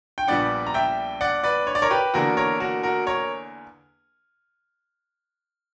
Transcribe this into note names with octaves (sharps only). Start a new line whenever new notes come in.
G5
A#1 A#2 G3 B3 D4 D5 F#5
A#5
E5 G5
D5 F#5
B4 D5
C#5
D5
A#4 C#5
G4 B4
E2 D3 A#3 D4 F#4 A#4
A#4 C#5
F#4 A#4
F#4 A#4
A#4 C#5